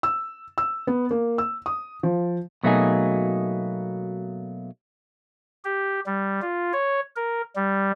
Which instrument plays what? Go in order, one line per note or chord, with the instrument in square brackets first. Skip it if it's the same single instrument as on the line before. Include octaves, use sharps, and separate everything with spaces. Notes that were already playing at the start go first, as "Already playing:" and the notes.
[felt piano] E6
E6
B3
A#3
E6
D#6
F3
[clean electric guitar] B2 F#3 A3 A#3 D#4 G#4
[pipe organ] G4
G3
F4
C#5
A#4
G3